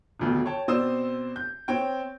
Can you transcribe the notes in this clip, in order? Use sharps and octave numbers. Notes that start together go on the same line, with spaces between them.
D#1 D2 B2
C#5 G5 A5
B2 C4 C5 D5 D#6 E6
G6
C4 C#5 G5